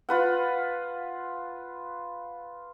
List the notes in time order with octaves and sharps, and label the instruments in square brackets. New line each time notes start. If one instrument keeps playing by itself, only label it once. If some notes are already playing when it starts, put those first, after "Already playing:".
[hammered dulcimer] F4 B4 F#5